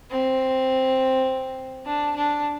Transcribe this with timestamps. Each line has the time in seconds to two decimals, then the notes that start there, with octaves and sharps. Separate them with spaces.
0.11 C4
1.86 D4
2.16 D4